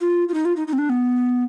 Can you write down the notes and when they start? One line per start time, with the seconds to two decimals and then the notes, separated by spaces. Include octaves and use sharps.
0.01 F4
0.29 F4
0.34 D#4
0.45 F4
0.56 D#4
0.67 D#4
0.73 C4
0.78 D4
0.89 B3